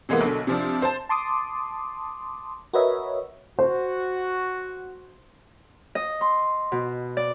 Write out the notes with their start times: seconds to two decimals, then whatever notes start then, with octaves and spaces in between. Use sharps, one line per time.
0.09 C3 E3 G#3 A#3 B3
0.21 B1 B2 D3
0.47 C3 F3 D4
0.82 C5 A5
1.09 A5 C6 D6 D#6
2.73 F#4 A#4 B4 C#5 D#5 E5
3.59 F#4 C5
5.95 D#5
6.21 C6
6.72 B2
7.17 D5